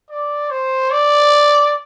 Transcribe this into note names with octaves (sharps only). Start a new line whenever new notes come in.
D5
C5
D5